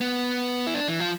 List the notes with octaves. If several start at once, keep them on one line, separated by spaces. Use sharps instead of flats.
B3
E4
D4
E3
F3